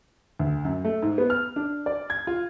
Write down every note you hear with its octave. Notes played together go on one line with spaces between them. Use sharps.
D2
F#2
A3
G#2
B3
F6
D4
D5
G#6
F4